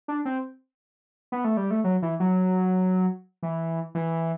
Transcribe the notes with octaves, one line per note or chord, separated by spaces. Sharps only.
D4
C4
B3
A3
G3
A3
F#3
E3
F#3
E3
E3